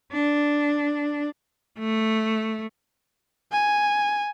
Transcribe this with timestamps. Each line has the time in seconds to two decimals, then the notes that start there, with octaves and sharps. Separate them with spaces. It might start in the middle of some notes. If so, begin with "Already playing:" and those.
0.12 D4
1.79 A3
3.52 G#5